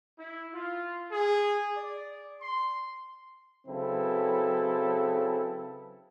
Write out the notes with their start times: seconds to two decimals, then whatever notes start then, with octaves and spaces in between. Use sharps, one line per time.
0.18 E4
0.54 F4
1.12 G#4
1.76 D5
2.42 C6
3.67 C#3 F#3 C4 E4 A4 B4